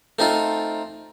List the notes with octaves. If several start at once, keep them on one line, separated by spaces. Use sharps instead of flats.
A3 C4 D#4 F4